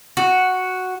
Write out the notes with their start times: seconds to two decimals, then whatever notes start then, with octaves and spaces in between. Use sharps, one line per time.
0.17 F#4